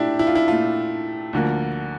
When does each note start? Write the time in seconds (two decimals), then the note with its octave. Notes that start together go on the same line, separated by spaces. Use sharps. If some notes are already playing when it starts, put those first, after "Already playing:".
Already playing: A#2 A3 D4 E4 G4
0.19 E4
0.27 F4
0.35 E4
0.47 A#2 A3 F4
1.33 D2 D3 F3 A#3